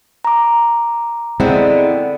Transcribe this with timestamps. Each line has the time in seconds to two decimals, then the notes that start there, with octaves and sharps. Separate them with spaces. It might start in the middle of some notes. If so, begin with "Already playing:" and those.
0.25 A#5 D6
1.40 D3 G#3 B3 C4 E4